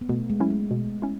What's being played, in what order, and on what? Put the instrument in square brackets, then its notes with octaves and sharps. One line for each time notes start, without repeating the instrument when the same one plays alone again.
[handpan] B3
[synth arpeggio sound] B2 [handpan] A3
[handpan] G#3
[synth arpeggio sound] F#3 C#4 E4
[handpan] G#3
[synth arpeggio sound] B2
C#4 E4